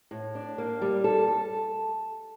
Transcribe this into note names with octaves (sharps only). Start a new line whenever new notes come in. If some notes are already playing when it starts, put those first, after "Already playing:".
A2
D4
A#3
G3
A4
A4